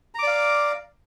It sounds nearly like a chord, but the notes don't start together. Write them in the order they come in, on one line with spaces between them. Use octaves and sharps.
A#5 D6 D5 F5